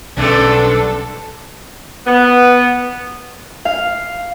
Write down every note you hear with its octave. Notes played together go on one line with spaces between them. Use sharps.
B1 G2 D3 A3 C#4 D4 A4
B3
F5